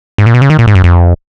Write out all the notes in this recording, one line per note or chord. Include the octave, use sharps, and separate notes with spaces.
G#2
A#2
B2
C#3
D#3
A#2
G#2
F#2
F2